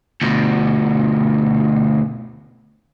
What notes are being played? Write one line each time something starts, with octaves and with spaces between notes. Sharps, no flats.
D2 B2